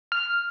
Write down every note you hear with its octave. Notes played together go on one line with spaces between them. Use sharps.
F6